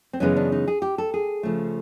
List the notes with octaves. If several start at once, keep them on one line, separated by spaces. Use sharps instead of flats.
C4
F#2 C#3 E3 G#3 B3 C#4
D4
D#4
G#4
G4
A4
G#4
C#3 F3 A3